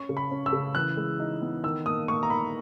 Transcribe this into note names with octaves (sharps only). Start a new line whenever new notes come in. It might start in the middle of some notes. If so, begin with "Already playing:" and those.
Already playing: C#4 C#6
C#3
B5
C#4
E6
C#3
E3 F#6
G#3
D#4
B3
D#3 E6
A#3 D#6
A#3 C#6
A#5
D#3 B5